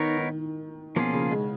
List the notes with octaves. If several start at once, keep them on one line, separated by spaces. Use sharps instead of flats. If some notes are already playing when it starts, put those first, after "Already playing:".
Already playing: D#3 B3 D#4 A#4 C#5
D#3
B2 F3 A#3 C#4 F4 G#4
C#3
G#3